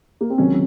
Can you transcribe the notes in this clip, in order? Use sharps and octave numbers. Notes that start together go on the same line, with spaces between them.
A#3
C4
C#2 C3 D#3 F#3 C#4